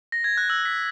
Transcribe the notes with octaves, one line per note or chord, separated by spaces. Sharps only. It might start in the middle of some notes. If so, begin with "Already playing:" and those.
A#6
G#6
F#6
E6
B6